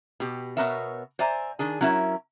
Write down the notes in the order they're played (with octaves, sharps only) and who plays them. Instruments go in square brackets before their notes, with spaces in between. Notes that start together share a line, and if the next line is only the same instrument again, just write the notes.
[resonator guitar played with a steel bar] B2 G4
B2 B3 C4 A#4 C#5 E5
C5 D5 E5 G#5 A#5
D#3 D4 G#4
F#3 C#4 E4 A#4 E5